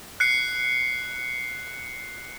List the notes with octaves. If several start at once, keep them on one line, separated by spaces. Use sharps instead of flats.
F#6 C7 C#7